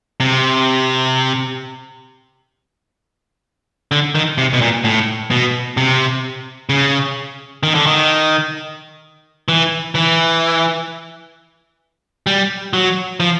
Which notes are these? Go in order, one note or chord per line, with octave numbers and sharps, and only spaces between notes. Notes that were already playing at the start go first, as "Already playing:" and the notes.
C3
D3
D#3
C3
B2
A#2
A2
B2
C3
C#3
D#3
D3
D#3
E3
E3
G3
F#3
F3